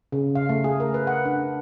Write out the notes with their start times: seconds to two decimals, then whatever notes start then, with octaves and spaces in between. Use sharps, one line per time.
0.12 C#3
0.35 F5
0.49 A3
0.64 G#4
0.80 A#4
0.94 B4
1.07 F#5
1.25 D4